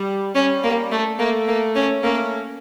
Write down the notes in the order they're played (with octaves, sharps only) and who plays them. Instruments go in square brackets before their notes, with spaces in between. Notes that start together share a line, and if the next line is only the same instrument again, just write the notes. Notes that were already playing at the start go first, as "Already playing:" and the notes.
Already playing: [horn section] G3
[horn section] G3 [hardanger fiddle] C#4
[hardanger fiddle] A#3
A3
[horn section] A3 [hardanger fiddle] A#3
[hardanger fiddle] A#3
C#4
[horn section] A3 C#4 [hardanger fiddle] A#3